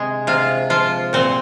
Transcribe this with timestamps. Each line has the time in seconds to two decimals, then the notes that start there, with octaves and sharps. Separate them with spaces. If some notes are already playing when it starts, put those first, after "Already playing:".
Already playing: C3 G#3 G#4
0.27 C3 F4
0.70 F3 F4
1.13 A#2 C4